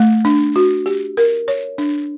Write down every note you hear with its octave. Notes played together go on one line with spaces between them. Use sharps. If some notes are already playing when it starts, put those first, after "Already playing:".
Already playing: A3
D4
F#4
G4
A#4
C#5
D4